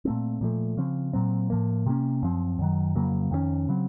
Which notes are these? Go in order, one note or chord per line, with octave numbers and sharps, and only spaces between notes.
A#2 A3 C4
A#2 F3 A3
C#3 F3 C4
A#2 F#3 C4
A2 F3 A#3
C3 F3 A#3 C#4
F#2 F3 C4
F#2 D#3 F#3
F2 C#3 F#3 A#3
F2 D#3 A3 C#4
C#3 F#3 C4